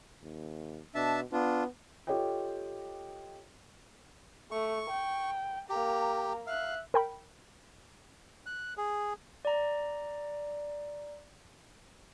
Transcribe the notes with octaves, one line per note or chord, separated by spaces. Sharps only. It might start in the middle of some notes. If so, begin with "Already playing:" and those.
D#2
B2 D4 E5 A5
B3 D4 F4
F4 G4 A4 C#5 D#5 G5
A3 C#6
G5
A#3 G4 A#5
E5 F5 F#6
A#4 G5 B5
F#6
G#4
D5 A#5